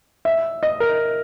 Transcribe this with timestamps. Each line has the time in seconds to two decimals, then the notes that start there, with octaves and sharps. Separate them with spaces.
0.25 E5
0.63 D#5
0.80 A#4